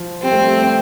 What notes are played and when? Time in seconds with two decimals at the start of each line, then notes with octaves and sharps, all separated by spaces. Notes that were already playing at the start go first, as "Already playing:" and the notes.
Already playing: F3
0.22 G3 C4
0.31 A3
0.40 G3